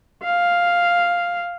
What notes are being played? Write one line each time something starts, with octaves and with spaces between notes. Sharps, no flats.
F5